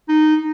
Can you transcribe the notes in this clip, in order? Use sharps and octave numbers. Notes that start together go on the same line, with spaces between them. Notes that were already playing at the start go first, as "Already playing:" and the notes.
D#4